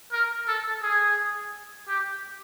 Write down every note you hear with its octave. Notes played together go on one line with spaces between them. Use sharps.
A#4
A4
G#4
G4